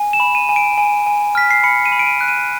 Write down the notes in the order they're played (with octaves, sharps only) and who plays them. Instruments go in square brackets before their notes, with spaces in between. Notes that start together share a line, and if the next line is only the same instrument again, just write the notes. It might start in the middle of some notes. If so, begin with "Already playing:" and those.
Already playing: [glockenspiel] G#5
E7
B5
D#7
G#5
D7
G#5
G#5
F6 B6
C7
B5 C#7
D#7
B5
D7
D#7
F#6
D#7